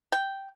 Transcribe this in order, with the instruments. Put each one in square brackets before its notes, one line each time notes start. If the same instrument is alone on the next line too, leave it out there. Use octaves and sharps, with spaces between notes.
[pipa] G5